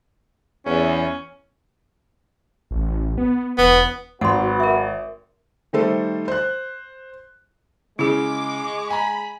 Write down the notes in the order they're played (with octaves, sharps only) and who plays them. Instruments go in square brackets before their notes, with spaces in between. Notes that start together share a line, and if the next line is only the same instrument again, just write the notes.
[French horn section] E2 [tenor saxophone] C#4
[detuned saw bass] A1
B3
[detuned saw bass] E1 [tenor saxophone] B3
[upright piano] G#1 [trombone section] F#3 B3 F#4 [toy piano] F#5 C6
[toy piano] A#4 E5
[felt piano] D#3 G3 A3 A4 C5
C5 F#6
[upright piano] C#3 [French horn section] G#3 [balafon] E4 G#4 [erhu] D6
[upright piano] G#5 A#5 [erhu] B5